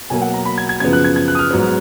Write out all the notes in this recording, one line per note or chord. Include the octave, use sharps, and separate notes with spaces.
B2 F#3 A#3 G#5
F#5
A#5
B5
G#6
G#6
F#2 C#3 F3 B3 G#6
F#6
G#6
G#6
F#6
D#6
F6
G#2 F#3 B3